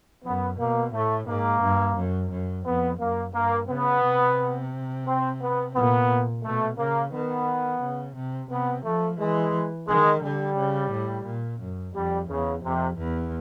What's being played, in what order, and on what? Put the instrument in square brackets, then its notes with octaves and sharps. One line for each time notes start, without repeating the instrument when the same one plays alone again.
[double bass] F#2 [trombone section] B3
[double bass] B2 [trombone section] A#3
[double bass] A2 [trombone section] A3
[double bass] G#2 [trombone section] A#3
[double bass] G2
F#2
F#2
[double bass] F2 [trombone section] B3
[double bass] F#2 [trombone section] A#3
[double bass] G2 [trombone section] A#3
[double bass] C#3 [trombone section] B3
[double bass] C3
[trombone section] C4
B3
[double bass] A#2 [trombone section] B3
[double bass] B2 [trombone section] A3
[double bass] C#3 [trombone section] A#3
[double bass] D#3 [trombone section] B3
[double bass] C#3
C3
[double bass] C3 [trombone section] B3
[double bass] F3 [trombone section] A3
[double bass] E3 [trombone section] G#3
[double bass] D#3 [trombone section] G#3
[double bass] D3 [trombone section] G3
[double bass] C#3
A2
A#2
F#2
[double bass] F2 [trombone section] G3
[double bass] E2 [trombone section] C#3
[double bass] F2 [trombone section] C3
[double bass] E2